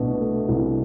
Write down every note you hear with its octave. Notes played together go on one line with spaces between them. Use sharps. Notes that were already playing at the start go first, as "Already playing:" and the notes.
Already playing: C2 B2 A3 D4
A3
C2